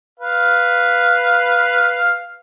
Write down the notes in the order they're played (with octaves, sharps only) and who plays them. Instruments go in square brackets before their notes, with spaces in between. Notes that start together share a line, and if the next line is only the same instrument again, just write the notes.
[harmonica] B4 F5